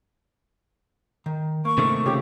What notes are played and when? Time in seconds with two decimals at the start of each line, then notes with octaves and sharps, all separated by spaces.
1.26 D#3
1.65 A#3 C#6
1.78 C3 D#3 A3
2.06 C#3 F4 G4 C#5